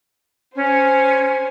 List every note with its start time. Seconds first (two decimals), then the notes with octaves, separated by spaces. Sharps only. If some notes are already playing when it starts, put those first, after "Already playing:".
0.56 C#4 C5 G#5